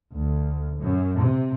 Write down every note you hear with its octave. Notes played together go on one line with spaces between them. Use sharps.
D2
F#2
C3